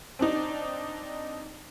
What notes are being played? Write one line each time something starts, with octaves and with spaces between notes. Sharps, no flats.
C4 D4 D#4